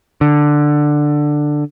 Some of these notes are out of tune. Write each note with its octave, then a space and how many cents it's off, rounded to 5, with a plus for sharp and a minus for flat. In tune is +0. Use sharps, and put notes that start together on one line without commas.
D3 +10